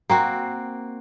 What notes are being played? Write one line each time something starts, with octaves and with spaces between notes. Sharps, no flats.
A#3 C4 F#4